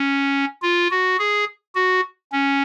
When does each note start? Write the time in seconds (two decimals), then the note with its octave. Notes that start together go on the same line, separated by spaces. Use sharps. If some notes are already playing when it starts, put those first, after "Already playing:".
Already playing: C#4
0.62 F4
0.91 F#4
1.19 G#4
1.75 F#4
2.32 C#4